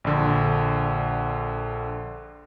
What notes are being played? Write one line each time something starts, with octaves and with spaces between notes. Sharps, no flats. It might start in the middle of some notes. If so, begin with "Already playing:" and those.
A#1 D3